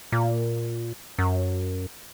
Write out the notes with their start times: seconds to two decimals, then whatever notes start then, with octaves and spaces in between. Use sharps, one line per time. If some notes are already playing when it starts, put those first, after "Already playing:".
0.12 A#2
1.19 F#2